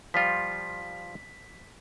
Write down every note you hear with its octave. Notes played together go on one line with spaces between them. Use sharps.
F3 G3 F4 B6